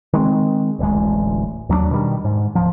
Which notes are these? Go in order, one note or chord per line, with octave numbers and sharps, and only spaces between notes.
D#3 G#3 C4
D1 A1 D2 G#3
D#2 F#3 A3 D4
B2 D#3 G3
G#2
D1 F3